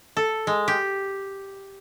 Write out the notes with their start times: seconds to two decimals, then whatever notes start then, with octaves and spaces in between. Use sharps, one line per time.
0.17 A4
0.47 G#3
0.68 G4